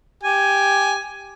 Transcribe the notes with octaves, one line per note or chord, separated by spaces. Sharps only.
G4 G#5